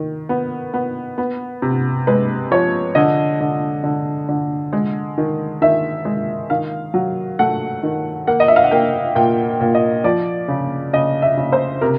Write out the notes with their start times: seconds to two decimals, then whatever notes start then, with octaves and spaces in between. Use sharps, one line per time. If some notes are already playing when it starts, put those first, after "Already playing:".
Already playing: D#3
0.29 B3
0.74 B3
1.18 B3
1.62 C3
2.07 G#3 B4
2.51 F3 C#5
2.95 D3 D#5
3.40 D3
3.84 D3
4.29 D3
4.73 G#3
5.18 D#3
5.62 D#3 E5
6.05 G#3
6.50 D#3 F5
6.94 F#3
7.39 A3 F#5
7.83 D#3
8.27 A#3 F#5
8.40 D#5
8.48 E5
8.56 F5
8.64 F#5
8.71 A#3 G5
9.15 A#2 G5
9.61 A#2
9.75 D#5
10.04 F3 D5
10.48 C#3
10.93 C#3 D#5
11.22 E5
11.37 C#3
11.52 C5
11.81 C3 A#4